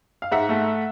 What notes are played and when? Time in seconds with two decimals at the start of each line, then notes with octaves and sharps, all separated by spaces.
0.22 F5
0.32 G#2 E5 F#5
0.49 A3